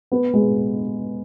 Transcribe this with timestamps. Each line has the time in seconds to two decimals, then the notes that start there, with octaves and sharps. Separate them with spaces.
0.12 B3
0.34 G#3